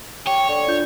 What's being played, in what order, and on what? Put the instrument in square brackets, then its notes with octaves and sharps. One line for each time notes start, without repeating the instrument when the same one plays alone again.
[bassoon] G4 [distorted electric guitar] C#5
[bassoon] D3 [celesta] C#6
[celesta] D4 F4 G6